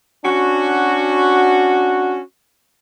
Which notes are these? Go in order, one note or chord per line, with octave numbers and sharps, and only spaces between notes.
C#4 D4 F#4